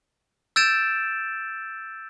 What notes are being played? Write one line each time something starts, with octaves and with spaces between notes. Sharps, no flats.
E6 G6 A6 D7 E7